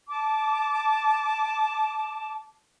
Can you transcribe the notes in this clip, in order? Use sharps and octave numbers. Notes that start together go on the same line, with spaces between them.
A5 D6